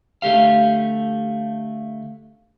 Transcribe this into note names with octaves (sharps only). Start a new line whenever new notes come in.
D3 A3 G4 F5